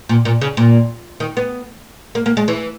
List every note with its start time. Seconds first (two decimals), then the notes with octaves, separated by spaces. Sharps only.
0.09 A#2
0.25 A#2
0.41 C#3
0.57 A#2
1.20 D#3
1.37 B3
2.15 A#3
2.26 A#3
2.37 G#3
2.48 E3